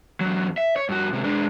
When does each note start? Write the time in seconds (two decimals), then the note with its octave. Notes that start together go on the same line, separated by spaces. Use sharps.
0.21 E2 F#3
0.58 E5
0.76 C#5
0.89 G2 F#4
1.13 C3 G#3
1.24 G#3 D4